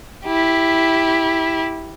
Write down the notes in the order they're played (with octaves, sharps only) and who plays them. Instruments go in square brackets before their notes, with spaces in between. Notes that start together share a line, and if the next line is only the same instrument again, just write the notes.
[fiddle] E4 G4